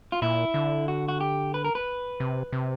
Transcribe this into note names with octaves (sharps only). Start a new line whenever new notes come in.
F4
A#2 E4
D3
F#4
F#4
G4
B4
A#4
B4
C3
C3